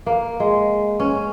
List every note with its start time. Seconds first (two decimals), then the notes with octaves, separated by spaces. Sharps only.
0.06 A#3
0.40 G#3
1.00 C#4